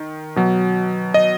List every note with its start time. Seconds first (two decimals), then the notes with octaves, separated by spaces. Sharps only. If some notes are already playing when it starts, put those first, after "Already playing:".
Already playing: D#3
0.36 B2 F#3
1.14 D#5